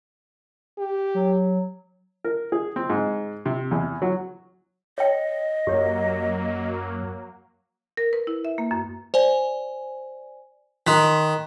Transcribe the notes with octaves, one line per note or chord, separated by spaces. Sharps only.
G4
F#3
A#4
G#4
C4
G#2
C3
E2
F#3
C#5 D#5 G5
F#2 F#3 A#3 G4 C#5
A#4
B4
E4
E5
A#3
F#2
C5 D5 G#5
D#3 C6 F#6 B6